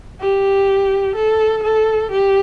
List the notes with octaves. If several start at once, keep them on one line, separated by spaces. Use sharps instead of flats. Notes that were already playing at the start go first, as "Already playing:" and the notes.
G4
A4
A4
G4